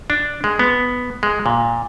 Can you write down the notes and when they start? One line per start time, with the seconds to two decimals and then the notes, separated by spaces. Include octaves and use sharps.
0.10 D4
0.44 G#3
0.59 B3
1.23 G#3
1.46 A#2